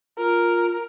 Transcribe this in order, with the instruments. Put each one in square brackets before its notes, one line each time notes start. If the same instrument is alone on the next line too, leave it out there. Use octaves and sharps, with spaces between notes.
[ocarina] F4 [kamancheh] A#4